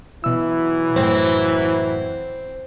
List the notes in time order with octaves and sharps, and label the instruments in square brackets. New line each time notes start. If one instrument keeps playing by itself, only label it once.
[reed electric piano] B2 E6 [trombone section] E3 F#3 E4
[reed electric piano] F#2 A2 [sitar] C4